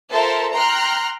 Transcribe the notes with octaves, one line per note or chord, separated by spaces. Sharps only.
F4 A4 A#4 C5 E5 A5
G5 A#5 C6 F6 F#6